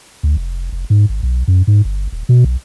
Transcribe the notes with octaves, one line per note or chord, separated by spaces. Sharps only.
D2
F1
F1
G#2
G#1
B1
F#2
G#2
G1
D#1
B2
B1